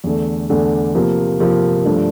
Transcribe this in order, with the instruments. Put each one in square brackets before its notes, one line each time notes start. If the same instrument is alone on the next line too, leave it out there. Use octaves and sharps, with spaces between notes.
[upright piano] E2 D3 A3
E2 D3 A3
C3 F3 A#3
C3 F3 A#3
G2 F3 A3 D4